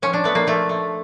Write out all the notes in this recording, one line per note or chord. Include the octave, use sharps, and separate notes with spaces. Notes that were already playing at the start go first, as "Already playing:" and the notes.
F3 C#4
D4
A3 B3
A#3
F3 A3
A3